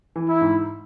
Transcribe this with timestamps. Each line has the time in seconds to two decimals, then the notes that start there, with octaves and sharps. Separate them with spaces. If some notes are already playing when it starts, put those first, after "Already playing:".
0.16 E3
0.29 E4
0.41 G#2